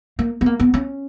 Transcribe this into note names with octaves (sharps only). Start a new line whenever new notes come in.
A#3
B3
A#3
B3
C#4